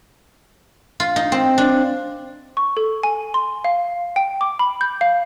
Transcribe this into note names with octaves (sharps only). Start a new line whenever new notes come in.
F4
D#4
C4
D4
C#6
A4
G#5
C6
F5
G5
D6
B5
G6
F5